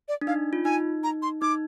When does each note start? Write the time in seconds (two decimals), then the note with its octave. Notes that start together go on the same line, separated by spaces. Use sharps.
0.08 D5
0.21 D4
0.27 D#4 F5
0.53 F4
0.65 D#4 G#5
1.03 A#5
1.22 C6
1.42 D#4 D6